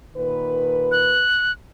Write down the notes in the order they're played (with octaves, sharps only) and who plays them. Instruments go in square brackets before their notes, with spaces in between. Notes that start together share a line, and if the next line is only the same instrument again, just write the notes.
[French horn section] A#2 D#3 B4
[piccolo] F#6